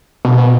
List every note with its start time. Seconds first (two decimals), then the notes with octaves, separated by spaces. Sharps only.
0.25 B2